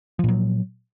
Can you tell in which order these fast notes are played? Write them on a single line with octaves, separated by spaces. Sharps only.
F3 A#2 F#3